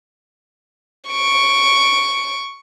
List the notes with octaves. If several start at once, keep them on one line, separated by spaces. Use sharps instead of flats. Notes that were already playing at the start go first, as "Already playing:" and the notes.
C#6 D7